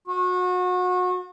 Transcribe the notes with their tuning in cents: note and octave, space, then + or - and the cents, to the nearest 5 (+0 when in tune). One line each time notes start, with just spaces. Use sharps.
F#4 -30